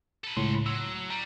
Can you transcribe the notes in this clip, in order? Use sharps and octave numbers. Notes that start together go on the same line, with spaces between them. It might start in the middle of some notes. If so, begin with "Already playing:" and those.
A4 B4
C#2 A2 C6
F#3 E6
G3 A#5